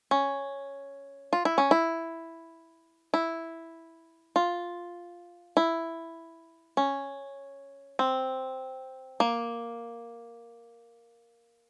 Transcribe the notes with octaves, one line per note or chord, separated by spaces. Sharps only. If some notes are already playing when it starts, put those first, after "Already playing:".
C#4
F4
E4
C#4
E4
E4
F4
E4
C#4
C4
A#3